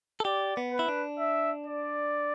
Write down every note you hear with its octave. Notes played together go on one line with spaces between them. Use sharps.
A4
G4 D5
B3
B4
E4
D4
E5
D5